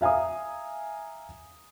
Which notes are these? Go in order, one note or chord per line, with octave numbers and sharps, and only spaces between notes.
E5 F5 G#5 A#5 D#6